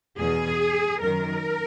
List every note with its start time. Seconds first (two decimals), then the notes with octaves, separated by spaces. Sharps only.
0.19 E2 B2 G#4
1.01 F#2 D#3 A#4